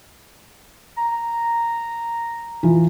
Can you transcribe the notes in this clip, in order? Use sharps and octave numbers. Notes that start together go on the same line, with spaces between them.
A#5
E3 F4